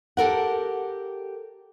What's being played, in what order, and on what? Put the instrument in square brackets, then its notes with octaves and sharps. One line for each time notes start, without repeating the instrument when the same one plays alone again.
[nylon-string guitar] G4 A4 A#4 F#5